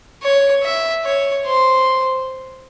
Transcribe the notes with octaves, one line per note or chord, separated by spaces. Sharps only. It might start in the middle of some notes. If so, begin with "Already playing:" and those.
C#5
E5
C#5
C5